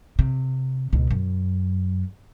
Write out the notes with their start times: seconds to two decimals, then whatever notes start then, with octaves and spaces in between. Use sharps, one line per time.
0.19 C3
0.93 C#2 B2
1.11 F#2